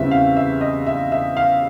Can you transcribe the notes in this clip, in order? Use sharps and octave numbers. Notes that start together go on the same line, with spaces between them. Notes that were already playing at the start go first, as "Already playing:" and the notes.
Already playing: E2 C#3 E3 G3 C4 E5
F5
E5
D#5
E5
E5
F5